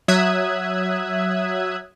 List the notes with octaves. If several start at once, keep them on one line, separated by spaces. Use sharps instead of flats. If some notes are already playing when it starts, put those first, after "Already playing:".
F#3 E5 D#6 E6 F#6 G#6